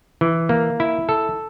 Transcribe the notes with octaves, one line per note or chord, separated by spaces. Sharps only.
E3
A#3
E4
A4